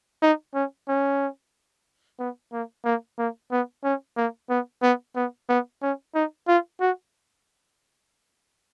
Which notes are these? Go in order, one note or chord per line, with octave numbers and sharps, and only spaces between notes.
D#4
C#4
C#4
B3
A#3
A#3
A#3
B3
C#4
A#3
B3
B3
B3
B3
C#4
D#4
F4
F#4